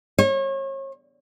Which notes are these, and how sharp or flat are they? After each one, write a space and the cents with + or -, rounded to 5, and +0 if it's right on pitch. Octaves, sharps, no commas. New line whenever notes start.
C#5 -35